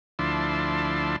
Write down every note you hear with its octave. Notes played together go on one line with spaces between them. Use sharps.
D2 F3 D4 E4 A5 C6